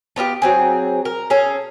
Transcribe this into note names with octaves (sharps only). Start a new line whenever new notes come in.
A3 B3 F4 G4
F#3 C4 G#4
A#4
C#4 G#4 A4